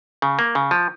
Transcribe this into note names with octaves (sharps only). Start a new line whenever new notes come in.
C#3
A#3
C#3
F3